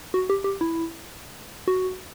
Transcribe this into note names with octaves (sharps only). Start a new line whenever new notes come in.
F#4
G4
G4
E4
F#4